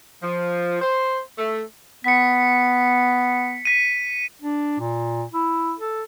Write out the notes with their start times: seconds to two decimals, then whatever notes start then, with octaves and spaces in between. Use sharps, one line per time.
0.22 F3
0.82 C5
1.38 A3
2.04 B3 B6 C#7
3.65 B6 D#7
4.42 D4
4.80 A#2
5.33 E4
5.79 A4